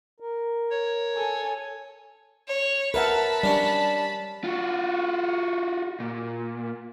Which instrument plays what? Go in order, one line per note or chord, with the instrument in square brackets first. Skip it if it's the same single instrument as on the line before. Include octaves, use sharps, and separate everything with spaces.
[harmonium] A#4
[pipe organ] C#5
[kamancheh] A4 G#5
[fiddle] C#5
[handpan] A#4 E5 F#5 [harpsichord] B4 [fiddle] A5 B5
[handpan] G3 [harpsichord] C#4 D4
[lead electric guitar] F4 F#4
A#2